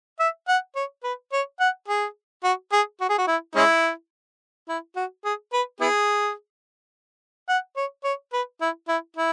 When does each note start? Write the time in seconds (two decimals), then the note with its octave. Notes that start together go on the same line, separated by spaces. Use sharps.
0.20 E5
0.48 F#5
0.76 C#5
1.04 B4
1.32 C#5
1.60 F#5
1.88 G#4
2.44 F#4
2.72 G#4
3.01 F#4
3.09 G#4
3.18 F#4
3.28 E4
3.56 G#3 C#4 E4
4.69 E4
4.96 F#4
5.25 G#4
5.53 B4
5.80 B3 E4 G#4
7.49 F#5
7.76 C#5
8.04 C#5
8.33 B4
8.61 E4
8.88 E4
9.17 E4